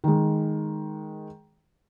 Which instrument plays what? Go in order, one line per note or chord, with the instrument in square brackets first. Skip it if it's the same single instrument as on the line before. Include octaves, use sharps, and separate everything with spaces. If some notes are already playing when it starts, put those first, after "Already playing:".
[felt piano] D#3 G#3